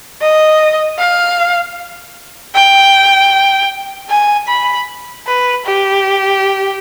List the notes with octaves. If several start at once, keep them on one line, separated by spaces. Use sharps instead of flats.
D#5
F5
G5
G#5
B5
B4
G4